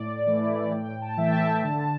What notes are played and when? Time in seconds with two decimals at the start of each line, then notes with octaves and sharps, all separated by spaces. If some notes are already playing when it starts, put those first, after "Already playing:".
Already playing: A2 D5
0.26 E3 A3 E4
0.72 A2 G5
1.02 A5
1.17 E3 A3 E5
1.26 G5
1.32 A5
1.63 D3